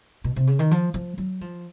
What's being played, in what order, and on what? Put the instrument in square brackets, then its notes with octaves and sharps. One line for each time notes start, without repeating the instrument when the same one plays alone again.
[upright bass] B2
C3
C#3
D#3
F3
F3
F#3
F3